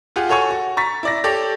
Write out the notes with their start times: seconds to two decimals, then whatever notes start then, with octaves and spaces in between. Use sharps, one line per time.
0.16 F4 G4 G#4 F#5
0.28 F#4 A4 C#5 G#5 C#6
0.50 F#4
0.77 A#5 C#6 A6 B6
1.03 E4 D5 A#6
1.24 G4 A4 C#5 D5